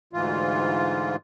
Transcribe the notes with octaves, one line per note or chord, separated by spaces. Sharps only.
D2 G#2 E3 F4